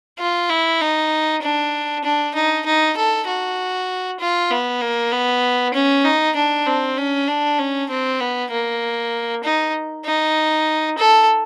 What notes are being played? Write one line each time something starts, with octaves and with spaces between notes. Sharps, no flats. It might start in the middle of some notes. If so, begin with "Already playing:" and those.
F4
E4
D#4
D4
D4
D#4
D#4
A4
F#4
F4
B3
A#3
B3
C#4
D#4
D4
C4
C#4
D4
C#4
C4
B3
A#3
D#4
D#4
A4